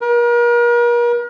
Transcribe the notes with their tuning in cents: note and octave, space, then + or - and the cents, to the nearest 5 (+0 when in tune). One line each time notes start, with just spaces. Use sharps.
A#4 +40